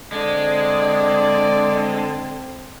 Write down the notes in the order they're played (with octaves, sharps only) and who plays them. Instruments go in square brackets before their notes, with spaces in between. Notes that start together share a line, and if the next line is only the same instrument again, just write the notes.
[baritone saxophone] D3 [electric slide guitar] G#3 [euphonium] C4 [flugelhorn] D5